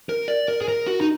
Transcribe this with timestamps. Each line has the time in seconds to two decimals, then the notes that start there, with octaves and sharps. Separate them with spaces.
0.09 A#4
0.28 D5
0.48 A#4
0.61 G#4
0.68 A#4
0.87 F#4
1.01 D#4